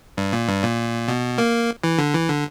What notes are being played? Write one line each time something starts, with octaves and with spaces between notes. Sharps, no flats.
G2
A#2
G2
A#2
B2
A#3
E3
D3
E3
D3